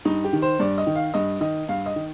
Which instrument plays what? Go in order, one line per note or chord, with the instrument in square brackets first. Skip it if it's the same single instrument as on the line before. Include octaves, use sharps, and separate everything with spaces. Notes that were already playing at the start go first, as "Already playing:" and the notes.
[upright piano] G2 D#4
G4
D#3
C5
G2 D5
D#5
D#3
F5
G2 D#5
D#3 D#5
G2 F5
D#5
D#3